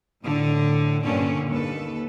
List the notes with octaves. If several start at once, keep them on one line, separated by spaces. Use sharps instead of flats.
A2 D3
G2 A#2 D3 A#3 C#4
D#2 A4 B4